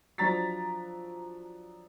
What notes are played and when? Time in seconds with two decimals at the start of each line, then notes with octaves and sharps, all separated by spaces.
0.18 F3 F#3 D4 A#5 A6 B6